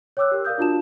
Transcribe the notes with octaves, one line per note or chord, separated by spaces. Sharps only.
C#5 G5 D6 E6 F#6
G4 A#4
A#4 D5 F5 D#6 G6
D4 F4 F#4 A5 E7